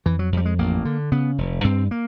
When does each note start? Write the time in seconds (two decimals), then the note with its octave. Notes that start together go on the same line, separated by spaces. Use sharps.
0.06 F2 E3
0.19 F#3
0.32 F2 G3
0.45 G#3
0.59 A1 A#3
0.85 D3
1.12 C#3 B3
1.38 F1
1.64 G2 C4
1.91 A#3